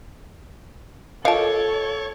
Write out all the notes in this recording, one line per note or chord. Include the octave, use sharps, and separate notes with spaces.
F4 A4 A#4 C#5 D#5 F5 A5